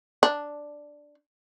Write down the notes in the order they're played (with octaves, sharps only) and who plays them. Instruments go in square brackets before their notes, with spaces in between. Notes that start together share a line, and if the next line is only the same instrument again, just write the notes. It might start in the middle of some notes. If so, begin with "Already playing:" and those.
[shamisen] D4